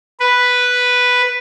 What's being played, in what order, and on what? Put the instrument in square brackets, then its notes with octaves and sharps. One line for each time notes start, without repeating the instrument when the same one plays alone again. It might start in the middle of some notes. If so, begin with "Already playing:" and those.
[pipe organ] B4